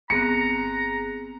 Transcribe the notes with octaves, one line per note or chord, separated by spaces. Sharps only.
G1 B3 C4 G#4 A#5 F#6 C#7